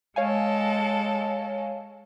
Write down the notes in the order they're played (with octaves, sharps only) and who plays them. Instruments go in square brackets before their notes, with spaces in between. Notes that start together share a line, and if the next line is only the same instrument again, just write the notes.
[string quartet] G#3 A4 [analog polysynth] C#5 F5 G#5